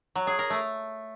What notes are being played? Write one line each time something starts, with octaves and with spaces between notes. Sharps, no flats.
F#3
G#4
A#4
A3